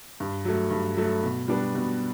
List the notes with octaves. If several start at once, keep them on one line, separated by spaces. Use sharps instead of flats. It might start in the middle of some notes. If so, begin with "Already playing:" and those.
G2
F#3 A3
G2
F#3 A3
B2
G3 B3 D4
B2